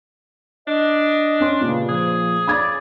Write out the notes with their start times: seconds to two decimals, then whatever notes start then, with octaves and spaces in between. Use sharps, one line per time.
0.67 D4 D#5
1.40 C#4 C6
1.61 G2 A#2 C#3
1.89 F3 G#4
2.47 C#3 D5 B5 D6 G#6